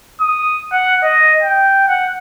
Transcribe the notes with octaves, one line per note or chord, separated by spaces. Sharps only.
D#6
F#5
D#5
G5
F#5